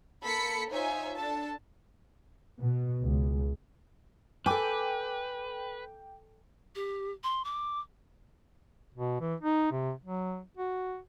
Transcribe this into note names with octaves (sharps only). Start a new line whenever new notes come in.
A#3 A4 B5 B6 C#7
D#4 F4 C5 C#5 E5 G#5
D4 A4 A5
B2
C#2
A4 B4 G5 G#5 D6
G4
C6
D6
B2
E3
D#4
C3
F#3
F#4